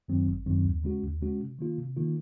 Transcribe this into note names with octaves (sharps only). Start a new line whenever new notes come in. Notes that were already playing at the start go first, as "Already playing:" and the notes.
F#2 D#3 F#3 C4
G#1
F#2 D#3 F#3 C4
D#2
C#3 G#3 C#4 F#4
D#2
C#3 G#3 C#4 F#4
C3
D#3 A#3 F4
C3
D#3 A#3 F4